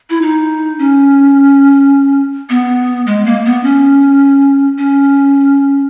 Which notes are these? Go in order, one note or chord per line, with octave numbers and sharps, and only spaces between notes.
E4
D#4
C#4
B3
G#3
A#3
B3
C#4
C#4